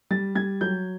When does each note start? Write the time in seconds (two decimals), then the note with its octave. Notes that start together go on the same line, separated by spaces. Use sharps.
0.11 G3 A6
0.35 G3 G#6
0.61 F#3 G6